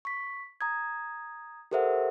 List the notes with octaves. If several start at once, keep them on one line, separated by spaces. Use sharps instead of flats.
C#6 B6
A#5 D#6 G#6
G4 A4 A#4 C5 E5 F#5